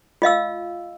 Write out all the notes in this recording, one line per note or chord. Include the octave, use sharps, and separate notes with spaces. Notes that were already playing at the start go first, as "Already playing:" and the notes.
F4 D#5 F5 E6